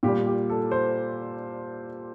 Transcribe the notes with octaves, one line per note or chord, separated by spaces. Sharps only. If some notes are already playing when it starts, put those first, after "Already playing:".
A#2 G3 G4
G4
A4
C5